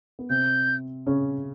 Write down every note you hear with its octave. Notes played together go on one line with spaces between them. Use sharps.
B3
C3 C4 G6
C#3 C#4